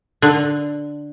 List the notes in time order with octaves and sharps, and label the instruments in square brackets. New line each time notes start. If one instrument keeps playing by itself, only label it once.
[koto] D3